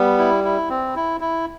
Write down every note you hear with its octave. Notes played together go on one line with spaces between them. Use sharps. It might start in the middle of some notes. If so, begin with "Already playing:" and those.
Already playing: G3 B3
E4
E4
C4
E4
E4